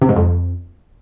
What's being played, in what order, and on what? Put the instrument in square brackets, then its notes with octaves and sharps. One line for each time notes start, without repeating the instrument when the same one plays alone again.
[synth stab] C3
G#2
F2